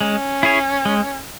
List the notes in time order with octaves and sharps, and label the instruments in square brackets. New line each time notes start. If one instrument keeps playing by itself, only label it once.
[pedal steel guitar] G#3 [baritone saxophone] C#4
[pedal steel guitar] E4 G#4 C#5
G#3